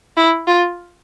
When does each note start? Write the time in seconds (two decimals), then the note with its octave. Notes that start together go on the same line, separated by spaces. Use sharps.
0.17 E4
0.47 F4